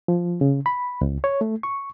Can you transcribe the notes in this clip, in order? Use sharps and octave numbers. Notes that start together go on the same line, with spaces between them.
F3
C#3
B5
C#2
C#5
A3
C#6